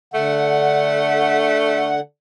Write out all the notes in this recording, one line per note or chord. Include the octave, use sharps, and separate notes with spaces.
D3 A3 F#5